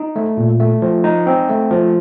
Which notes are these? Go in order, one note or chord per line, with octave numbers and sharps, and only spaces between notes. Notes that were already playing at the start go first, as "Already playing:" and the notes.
Already playing: D#4
A3
A#2
A3
F3
D#4
C4
A3
F3